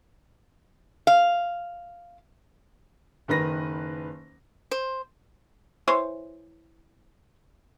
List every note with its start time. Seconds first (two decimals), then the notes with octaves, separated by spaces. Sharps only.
1.07 F5
3.28 F#1 D#3 B4 A#6
4.71 C5
5.88 E3 C5 C#5